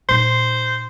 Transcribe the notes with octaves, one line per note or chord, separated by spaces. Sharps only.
A#2 D#4 C5